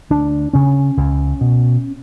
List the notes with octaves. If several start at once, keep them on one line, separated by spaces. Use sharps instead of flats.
D2 D4
C#3 C#4
C#2
B2